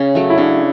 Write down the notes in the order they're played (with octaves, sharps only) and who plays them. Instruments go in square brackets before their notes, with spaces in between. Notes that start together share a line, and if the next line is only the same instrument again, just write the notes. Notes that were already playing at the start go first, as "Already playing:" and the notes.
Already playing: [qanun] C#3 [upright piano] C#4
[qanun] F#3 A3
[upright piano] E4
[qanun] C#3 [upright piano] D4